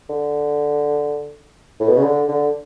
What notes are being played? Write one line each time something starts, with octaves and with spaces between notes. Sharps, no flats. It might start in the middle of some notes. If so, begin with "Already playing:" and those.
D3
A2
B2
C#3
D3
D3